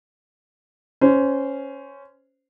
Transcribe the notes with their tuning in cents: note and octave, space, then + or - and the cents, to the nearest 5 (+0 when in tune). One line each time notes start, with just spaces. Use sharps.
C#4 +0 C5 -15